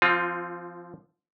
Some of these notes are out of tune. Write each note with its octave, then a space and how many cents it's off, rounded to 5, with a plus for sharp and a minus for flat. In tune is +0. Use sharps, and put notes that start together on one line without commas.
F3 -20 C4 +0 F4 +20